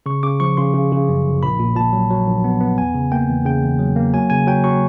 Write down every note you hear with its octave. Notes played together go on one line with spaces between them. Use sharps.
C#3 C#6
C#3 D6
F3 C#6
C#3 C6
C#3
C#3
F#2
G1
A#1 B5
A#2
A#2 A5
F#3
F#3
A#1
B3
B3
E2 G#5
C#3
A#3 G5
E2
C#3 G5
E2
F#3
A#3
F#3 G#5
C#3 G#5
F#3 G5
F#3 C#6